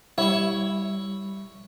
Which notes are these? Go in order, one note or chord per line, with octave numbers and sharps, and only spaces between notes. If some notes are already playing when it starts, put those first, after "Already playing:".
G3 E4 C#5 E5 C#6